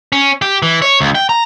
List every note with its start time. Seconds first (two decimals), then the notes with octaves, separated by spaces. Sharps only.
0.13 C#4
0.42 G4
0.63 E3
0.82 C#5
1.01 C#2
1.15 G5
1.29 A#5